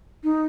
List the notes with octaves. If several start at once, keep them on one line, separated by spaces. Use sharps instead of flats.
D#4